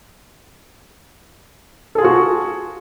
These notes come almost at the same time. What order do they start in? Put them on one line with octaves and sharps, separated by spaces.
A4 G#4 F4 F#4